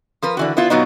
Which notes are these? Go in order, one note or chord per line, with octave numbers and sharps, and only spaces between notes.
F3 A#4 B4
D3 E3 F#4
B3 E4 F4
B2 F#3 B3 D#4